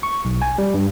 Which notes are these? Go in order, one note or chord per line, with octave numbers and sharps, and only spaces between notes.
C#6
B1
G#5
G3
G2